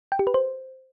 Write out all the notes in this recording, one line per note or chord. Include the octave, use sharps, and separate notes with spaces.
G5
G4
B4
C5